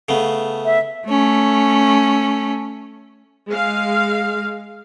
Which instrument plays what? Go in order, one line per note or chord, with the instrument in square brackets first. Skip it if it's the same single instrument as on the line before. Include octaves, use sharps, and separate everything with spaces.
[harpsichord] C#3 A3 B3
[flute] E5
[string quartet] A3 C#4
[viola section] G#3 F5